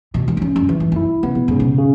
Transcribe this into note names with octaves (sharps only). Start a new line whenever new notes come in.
B2 E3
G#2
F#2
E2 C#4
F#2
F#2 E3
G#2
F#2 E4
C#3 B3
B2
G#2 C#3
B2
C#3